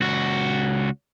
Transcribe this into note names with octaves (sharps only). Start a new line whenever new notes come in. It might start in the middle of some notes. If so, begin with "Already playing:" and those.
C#2 F#4